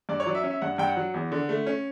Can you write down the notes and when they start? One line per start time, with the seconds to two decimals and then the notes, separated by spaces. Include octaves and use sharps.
0.09 G2 D5
0.20 C#5
0.26 F#3 D5
0.35 E5
0.43 C#4
0.51 E5
0.62 G2 F#5
0.78 G2 G5
0.87 F#5
0.97 F#3
1.14 E2
1.32 D3
1.49 A3
1.66 C#4